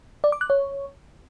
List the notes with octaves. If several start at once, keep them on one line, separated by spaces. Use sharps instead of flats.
D5
D6
F#6
C#5